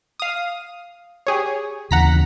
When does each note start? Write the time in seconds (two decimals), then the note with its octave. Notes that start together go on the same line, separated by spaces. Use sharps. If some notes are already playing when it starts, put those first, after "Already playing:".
0.20 F5 D#6
1.27 G4 G#4 C#5
1.91 D#2 C#3 E3 F#5 A#5 B6